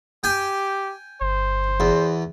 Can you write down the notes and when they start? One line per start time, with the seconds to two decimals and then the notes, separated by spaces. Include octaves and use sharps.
0.24 G4 G5 G#5
1.21 G1 C5
1.80 E2